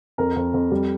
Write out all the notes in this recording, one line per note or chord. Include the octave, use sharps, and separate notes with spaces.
F2 A#4
F2
F2
G3